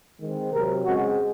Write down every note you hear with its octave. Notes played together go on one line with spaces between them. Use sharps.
D#3 G#3 C4
C3 F#3 C4 A#4
C#3 G#3 C4 F#4